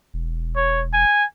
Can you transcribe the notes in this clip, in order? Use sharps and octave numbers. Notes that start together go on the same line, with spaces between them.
E1
C#5
G#5